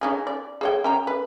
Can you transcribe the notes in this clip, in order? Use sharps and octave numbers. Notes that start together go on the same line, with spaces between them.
C#4 D#4 G#4
D5
G#4 C#5 G5
C#4 G5 A#5
B4